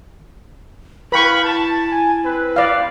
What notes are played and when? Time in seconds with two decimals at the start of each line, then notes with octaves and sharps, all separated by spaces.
1.12 E4 B4 F5 G5 B5 C#6
1.44 A5
1.91 G#5
2.24 C4 B4
2.56 D5 F5